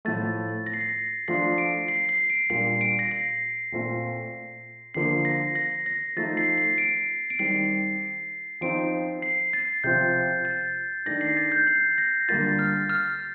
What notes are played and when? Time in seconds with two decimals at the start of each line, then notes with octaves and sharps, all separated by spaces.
0.05 A2 F3 A3 A6
0.66 A#6
0.74 C7
0.81 A#6
1.28 F3 A3 D4 F4 C7
1.58 D7
1.88 C7
2.09 C7
2.30 D7
2.50 A#2 G3 A#3 D4 F4 C7
2.81 D7
2.99 A#6
3.11 C7
3.72 A#2 A3 C4 F4
4.94 D3 F3 A#3 C7
5.25 A#6
5.55 A#6
5.86 A#6
6.16 F3 A3 D#4 A6
6.37 C7
6.58 C7
6.78 D7
7.30 D7
7.39 D#3 G3 C4 C7
8.61 F3 C4 D#4 D7
9.22 C7
9.53 A6
9.84 C3 F3 C4 G6
10.45 A6
11.06 D#3 A3 D4 A#6
11.21 C7
11.37 A6
11.52 G6
11.67 C7
11.98 A#6
12.28 D3 G3 A#3 F4 A6
12.59 F6
12.89 F6